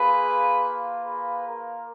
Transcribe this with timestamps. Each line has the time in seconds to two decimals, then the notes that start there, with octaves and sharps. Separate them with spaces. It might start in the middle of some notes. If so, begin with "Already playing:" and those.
Already playing: A#3 F4 G#4 B4
1.03 G#4 B4
1.46 A#4